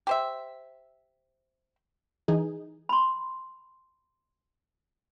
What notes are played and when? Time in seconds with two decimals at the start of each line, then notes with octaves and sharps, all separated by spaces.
0.07 G4 C5 E5
2.28 E3 D#4 G#4
2.89 B5 C6